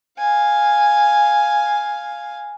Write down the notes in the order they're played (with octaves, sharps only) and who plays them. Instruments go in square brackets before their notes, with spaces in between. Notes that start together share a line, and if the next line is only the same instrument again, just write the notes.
[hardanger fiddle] F5 G#5